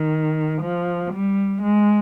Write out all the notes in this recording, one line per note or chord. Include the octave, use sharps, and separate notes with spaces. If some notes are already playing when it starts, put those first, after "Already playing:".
Already playing: D#3
F3
G3
G#3